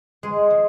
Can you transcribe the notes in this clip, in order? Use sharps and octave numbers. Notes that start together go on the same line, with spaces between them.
G#3 G#4
F3